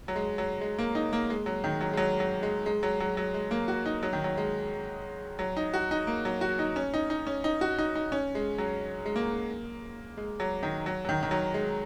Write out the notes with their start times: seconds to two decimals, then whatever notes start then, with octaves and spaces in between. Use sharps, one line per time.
0.08 F#3
0.16 G#3
0.38 F#3
0.61 G#3
0.79 A#3
0.95 D#4
1.13 A#3
1.30 G#3
1.46 F#3
1.64 D#3
1.81 F#3
1.93 G#3
1.97 F#3
2.20 F#3
2.43 G#3
2.66 G#3
2.83 F#3
3.00 F#3
3.17 F#3
3.34 G#3
3.51 A#3
3.68 F#4
3.86 D#4
4.03 F#3
4.13 D#3
4.24 F#3
4.37 G#3
5.39 F#3
5.57 D#4
5.74 F#4
5.91 D#4
6.07 A#3
6.25 F#3
6.41 F#4
6.59 D#4
6.76 C#4
6.94 D#4
7.10 D#4
7.27 C#4
7.44 D#4
7.61 F#4
7.78 D#4
7.95 D#4
8.12 C#4
8.35 G#3
8.58 F#3
9.06 G#3
9.16 A#3
10.17 G#3
10.40 F#3
10.63 D#3
10.86 F#3
11.05 F#3
11.09 D#3
11.23 D#3
11.31 F#3
11.54 G#3